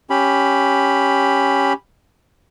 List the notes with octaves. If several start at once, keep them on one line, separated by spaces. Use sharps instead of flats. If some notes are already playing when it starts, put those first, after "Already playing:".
C#4 G4 B5